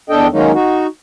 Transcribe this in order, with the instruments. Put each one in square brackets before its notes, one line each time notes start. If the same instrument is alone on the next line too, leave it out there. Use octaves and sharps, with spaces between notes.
[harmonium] E2 D4 A4 D#5 G5
D#3 F#3 G#3 A#3 C#4 D#4
D#4 F#4